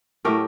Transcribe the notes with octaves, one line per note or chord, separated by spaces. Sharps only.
A2 F#3 A3 G4 A#4